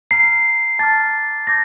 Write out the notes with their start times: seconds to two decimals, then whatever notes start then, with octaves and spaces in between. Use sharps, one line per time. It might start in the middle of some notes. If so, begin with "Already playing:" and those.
0.11 A#5 F6 C7
0.79 A5 D6 F6 A6
1.47 A5 D6 G6 A#6